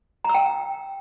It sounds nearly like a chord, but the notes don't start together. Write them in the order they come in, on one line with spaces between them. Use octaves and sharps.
A#5 E6 G5